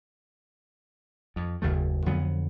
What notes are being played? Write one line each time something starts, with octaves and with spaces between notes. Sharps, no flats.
F2
F#1 D#2 C#3 A3
F2 D3 F#3 B3